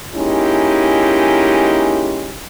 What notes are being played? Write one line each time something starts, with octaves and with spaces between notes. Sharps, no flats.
G#3 A#3 C#4 D#4 E4 G4